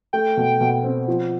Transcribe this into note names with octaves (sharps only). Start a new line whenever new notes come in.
A3 G5
B2
B2
C4
F3